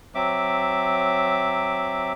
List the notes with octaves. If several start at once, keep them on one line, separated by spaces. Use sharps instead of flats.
F#3 C4 E5 D6